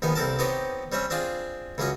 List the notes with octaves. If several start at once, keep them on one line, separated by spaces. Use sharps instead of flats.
A#1 D#3 B3 D#4 G#5
C2 C4 A4 A#4 A5
B3 C4 D#4 G4 C#5 D#5
G3 C4 C#4 E5
C4 D4 F4 G#4
C#2 F#2 F#3 C#4 D#5 C#6